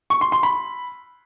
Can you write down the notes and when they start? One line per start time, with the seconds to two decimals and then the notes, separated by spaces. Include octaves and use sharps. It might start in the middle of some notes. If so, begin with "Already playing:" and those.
0.10 C#6
0.21 C6
0.32 C6
0.43 B5